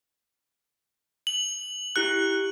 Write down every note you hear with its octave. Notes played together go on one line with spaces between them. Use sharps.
F#7
E4 G4 F#6 C#7